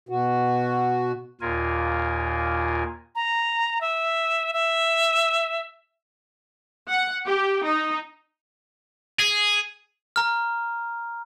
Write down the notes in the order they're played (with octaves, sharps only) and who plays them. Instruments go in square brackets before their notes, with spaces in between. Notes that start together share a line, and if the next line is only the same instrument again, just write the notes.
[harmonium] B2 F#4
[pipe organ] D#2 A#2 F4 A#4 G#5
[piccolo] A#5
E5
E5
[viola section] F#5
G4
D#4
[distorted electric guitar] G#4
[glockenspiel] A#5 F6